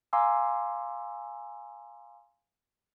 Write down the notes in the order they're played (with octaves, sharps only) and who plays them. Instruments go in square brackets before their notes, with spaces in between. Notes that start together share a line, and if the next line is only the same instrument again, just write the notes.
[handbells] F5 G#5 A#5 C6 D6 E6